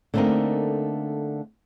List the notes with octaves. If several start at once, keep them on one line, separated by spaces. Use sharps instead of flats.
D3 A3 A#3 C4 D#4 A#4